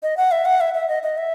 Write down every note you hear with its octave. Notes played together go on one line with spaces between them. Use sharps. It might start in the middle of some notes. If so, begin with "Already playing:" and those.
D#5
F#5
E5
F#5
E5
E5
D#5
D#5
E5